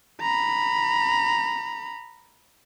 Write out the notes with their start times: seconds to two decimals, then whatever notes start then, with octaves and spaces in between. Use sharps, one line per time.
0.21 A#5 B5